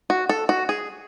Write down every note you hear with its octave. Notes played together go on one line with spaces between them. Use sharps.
F#4
A4
F#4
G#4